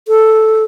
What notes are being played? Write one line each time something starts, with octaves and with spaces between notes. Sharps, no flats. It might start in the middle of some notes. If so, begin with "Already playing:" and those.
A4